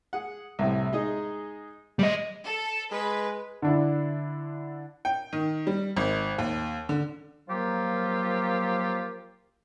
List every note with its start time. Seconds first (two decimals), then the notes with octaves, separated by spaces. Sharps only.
0.13 G#4 F#5
0.59 C2 A2 C3
0.93 G#3 D#4 G#4
1.99 G3 D#5
2.44 A4
2.92 G#3 B4
3.62 D3 D4 E4
5.05 G5
5.33 D#3
5.67 G3
5.97 G#1
6.38 D#2
6.89 D3
7.48 F3 F#3 A#3 F4 G4 A#4